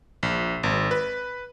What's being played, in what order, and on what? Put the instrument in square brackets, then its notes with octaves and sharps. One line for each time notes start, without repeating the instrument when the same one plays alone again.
[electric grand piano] A#1
G#1
B4